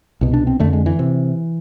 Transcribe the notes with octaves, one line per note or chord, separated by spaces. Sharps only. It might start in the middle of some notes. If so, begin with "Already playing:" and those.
C2 B2
D4
C4
F2 D3 A3
G#3
E3
C3